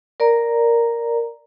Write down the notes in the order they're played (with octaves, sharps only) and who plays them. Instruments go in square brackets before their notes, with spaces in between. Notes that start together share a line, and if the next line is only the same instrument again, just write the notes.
[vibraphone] A#4 D5 A#5